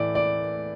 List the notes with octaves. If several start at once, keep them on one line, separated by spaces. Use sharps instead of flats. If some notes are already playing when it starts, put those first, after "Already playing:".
Already playing: A2 E3 D5
D5